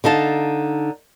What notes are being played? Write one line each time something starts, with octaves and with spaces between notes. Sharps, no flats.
D3 D#4 F5 A5